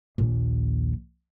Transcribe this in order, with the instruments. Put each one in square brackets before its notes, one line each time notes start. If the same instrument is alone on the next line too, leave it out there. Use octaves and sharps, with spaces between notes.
[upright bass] A#1 D#2